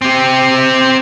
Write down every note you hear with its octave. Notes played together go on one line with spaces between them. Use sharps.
C4 G4